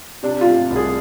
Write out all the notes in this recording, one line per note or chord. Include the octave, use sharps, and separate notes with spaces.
C3 D4
F4
C3
C2
G#4